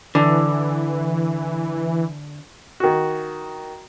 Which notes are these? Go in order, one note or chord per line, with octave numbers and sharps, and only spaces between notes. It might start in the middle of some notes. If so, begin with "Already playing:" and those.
D3 E3
D#3 F#4